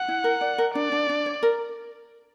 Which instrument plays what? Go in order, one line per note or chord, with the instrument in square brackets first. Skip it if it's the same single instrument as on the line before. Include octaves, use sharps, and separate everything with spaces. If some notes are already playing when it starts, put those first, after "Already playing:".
Already playing: [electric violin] F#5
[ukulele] E4
A#4
D5
A#4
[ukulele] D4 [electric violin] D5
[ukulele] D4
D4
C#5
A#4